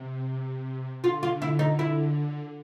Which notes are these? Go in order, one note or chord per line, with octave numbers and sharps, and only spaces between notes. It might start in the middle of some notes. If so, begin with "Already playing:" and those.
Already playing: C3
D3 F4
F4
E4
D#4
E4